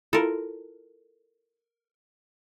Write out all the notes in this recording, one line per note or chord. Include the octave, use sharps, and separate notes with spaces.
E4 F4 A4 A#4